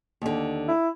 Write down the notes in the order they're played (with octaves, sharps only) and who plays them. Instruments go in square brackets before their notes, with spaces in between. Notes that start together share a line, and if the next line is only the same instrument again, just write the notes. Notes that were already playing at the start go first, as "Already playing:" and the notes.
[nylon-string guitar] D#2 D3
[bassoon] E4